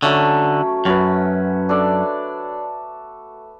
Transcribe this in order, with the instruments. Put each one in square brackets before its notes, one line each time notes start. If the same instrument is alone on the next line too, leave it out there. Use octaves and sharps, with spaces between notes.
[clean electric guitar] D3 [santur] F#3 A3 C#4
[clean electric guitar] F#2 [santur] C#4 F#4 B4
[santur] D4 A4 D5